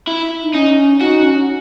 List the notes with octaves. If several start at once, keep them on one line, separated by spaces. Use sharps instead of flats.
E4
D#4
C#4 D#4
D#4 F#4
C#4